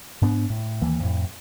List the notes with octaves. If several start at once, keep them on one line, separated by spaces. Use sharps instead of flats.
G#2 B3 D4
A2
D#2 E3 A#3
F2 A2